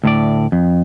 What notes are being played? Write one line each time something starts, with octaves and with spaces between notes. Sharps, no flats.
D2 A2 D5
F2